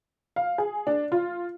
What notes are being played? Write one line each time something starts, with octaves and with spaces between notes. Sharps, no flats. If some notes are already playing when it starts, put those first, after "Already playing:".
F5
G#4
D4
F4